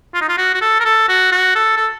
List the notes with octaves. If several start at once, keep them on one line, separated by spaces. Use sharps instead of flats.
F4
D#4
F4
F#4
F#4
A4
A#4
A4
F#4
F#4
A4
A4